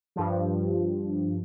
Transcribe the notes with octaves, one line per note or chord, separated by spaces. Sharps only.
G2 F3